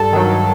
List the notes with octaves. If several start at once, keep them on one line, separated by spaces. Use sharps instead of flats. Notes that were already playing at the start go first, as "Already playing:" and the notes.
Already playing: G2 A4
D#3 F#3